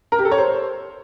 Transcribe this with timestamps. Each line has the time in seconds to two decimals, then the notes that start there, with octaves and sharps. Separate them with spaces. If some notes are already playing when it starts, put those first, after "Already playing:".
0.12 A#4
0.19 G4
0.25 A4
0.31 C#5
0.38 C5